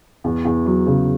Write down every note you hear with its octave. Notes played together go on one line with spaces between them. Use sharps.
E2
E2
F#3
C#3